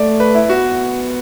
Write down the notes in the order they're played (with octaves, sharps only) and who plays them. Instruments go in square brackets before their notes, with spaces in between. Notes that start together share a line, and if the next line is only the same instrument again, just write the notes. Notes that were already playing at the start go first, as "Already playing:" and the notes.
Already playing: [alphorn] A3 [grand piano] D5
[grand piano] B4
E4
[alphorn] B3 [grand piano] F#4